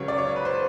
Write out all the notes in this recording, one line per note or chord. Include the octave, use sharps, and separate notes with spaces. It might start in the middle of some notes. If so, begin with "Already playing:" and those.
Already playing: C#2 C#3 F#3 C#5
D5
C#5
B4
C5